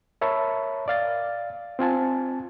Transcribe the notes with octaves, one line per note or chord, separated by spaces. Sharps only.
A#4 C#5 E5 A5 B5
D5 F5 A6
C4 F4 G#5 A5